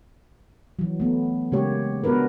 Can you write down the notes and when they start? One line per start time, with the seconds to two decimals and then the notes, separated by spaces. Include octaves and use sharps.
0.79 E3 F#3
1.00 A3 B3
1.52 C#3 G#3 A#3 G4 C#5
2.04 B3 D4 F#4 A#4 B4